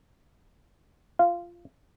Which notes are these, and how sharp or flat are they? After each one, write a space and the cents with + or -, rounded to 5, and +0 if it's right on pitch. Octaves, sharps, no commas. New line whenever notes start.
F4 -10 F5 -15